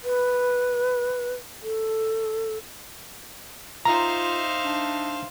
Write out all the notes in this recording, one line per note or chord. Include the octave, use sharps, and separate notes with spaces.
B4
A4
D#4 F4 C5 E5 F5 A#5
D4